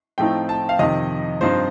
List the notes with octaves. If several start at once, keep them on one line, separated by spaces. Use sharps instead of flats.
A2 F3 A3 C4 D#4 G5
A5
F5
F2 C3 D#3 D#5
G2 F3 C4 D#4 C5